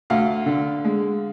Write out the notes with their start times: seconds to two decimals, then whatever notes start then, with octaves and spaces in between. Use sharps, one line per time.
0.10 D2 F5
0.46 D3
0.85 G#3